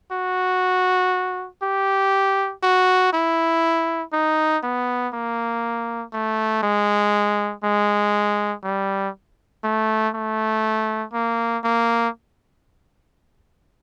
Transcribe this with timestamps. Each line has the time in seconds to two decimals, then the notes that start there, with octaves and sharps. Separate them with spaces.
0.12 F#4
1.63 G4
2.63 F#4
3.13 E4
4.13 D#4
4.63 B3
5.14 A#3
6.13 A3
6.63 G#3
7.64 G#3
8.64 G3
9.64 A3
10.14 A3
11.13 A#3
11.64 A#3